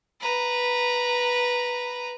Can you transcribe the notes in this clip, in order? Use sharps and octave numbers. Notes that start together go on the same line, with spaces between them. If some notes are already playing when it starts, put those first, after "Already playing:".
B4 A#5